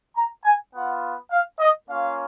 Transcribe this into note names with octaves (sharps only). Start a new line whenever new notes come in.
A#5
G#5
B3 F4 F#5
F5
D#5
A#3 C#4 F4 F5